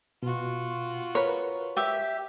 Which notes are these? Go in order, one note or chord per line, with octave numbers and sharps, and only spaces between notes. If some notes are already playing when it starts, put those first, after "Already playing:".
B2 F4 F#4
A#4 B4 C#5
G4 E5